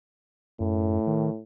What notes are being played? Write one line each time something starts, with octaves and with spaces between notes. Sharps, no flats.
F#2 A2
D#3